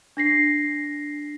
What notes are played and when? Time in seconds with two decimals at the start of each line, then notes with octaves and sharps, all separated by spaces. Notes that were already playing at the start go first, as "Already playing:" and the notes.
0.17 D4 A#6 C7